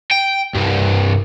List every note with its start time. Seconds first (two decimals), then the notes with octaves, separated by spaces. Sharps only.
0.11 G5
0.55 C2 G2